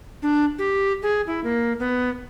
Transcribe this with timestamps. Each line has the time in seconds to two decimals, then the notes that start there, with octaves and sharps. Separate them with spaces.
0.22 D4
0.58 G4
1.02 G#4
1.27 E4
1.44 A#3
1.79 B3